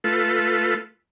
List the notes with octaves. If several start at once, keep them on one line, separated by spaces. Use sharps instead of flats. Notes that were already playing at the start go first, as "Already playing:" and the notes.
A3 F4 A4 B4